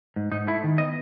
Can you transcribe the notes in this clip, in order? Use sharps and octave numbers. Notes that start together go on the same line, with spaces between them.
G#2
G#2 D#4
A3 E4
D#3
B3 D#5